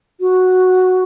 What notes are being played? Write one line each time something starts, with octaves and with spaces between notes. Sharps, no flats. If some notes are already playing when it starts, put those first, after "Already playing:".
F#4